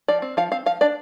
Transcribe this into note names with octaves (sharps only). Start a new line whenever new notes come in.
F3 D5
C4
F3 F5
C4 F5
F3 F5
D4 D5